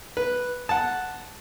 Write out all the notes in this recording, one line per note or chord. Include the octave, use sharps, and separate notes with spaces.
B4
F#5 A5